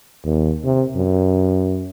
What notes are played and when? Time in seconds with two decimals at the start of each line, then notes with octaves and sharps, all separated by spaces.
0.25 D#2
0.64 C3
0.96 F#2